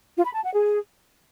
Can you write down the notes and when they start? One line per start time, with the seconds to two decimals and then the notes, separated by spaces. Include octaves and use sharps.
0.17 F4
0.26 B5
0.35 A5
0.44 F#5
0.52 G#4